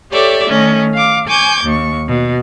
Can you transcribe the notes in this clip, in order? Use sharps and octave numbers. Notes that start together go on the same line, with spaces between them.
G4 A4 C#5 D5 E5
D#3 A3 C#4
F5 D6
G#5 C#6 D6 G6 G#6
D#2 C#6
B2